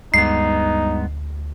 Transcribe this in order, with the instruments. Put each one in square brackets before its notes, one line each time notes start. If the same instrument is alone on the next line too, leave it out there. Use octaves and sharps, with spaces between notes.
[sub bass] D2 [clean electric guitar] G2 G#3 B3 [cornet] D#4 [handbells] C7